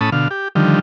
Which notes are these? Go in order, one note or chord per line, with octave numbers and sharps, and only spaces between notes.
A2 C#4 A5 B5 D#6
B2 D3 F5
G4
D3 D#3 F3 G3